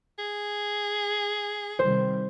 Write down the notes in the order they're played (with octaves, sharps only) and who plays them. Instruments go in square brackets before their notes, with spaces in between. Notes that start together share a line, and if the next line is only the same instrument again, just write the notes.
[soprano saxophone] G#4
[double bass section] C3 D#3 G3 [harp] C5